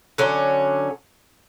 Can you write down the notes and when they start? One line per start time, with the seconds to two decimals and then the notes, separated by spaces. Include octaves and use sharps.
0.18 D3 F#3 C#4